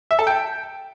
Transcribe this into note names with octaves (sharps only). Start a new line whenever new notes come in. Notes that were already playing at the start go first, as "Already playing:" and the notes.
E5
A4
G5